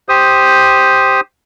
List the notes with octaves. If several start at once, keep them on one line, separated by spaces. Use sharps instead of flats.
G4 C5 D#6